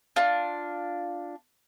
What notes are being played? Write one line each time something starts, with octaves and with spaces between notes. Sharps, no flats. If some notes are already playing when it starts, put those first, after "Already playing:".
D4 F4